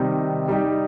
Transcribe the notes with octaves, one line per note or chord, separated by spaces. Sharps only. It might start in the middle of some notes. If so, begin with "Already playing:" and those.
Already playing: C3 D#3 G3 C4 D#4
G3 D#4 G4